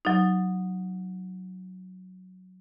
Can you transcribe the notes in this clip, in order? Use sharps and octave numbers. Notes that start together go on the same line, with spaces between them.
F#3 D#4